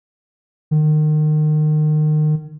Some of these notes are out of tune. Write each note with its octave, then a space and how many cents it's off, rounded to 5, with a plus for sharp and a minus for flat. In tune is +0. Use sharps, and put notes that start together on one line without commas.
D#3 -30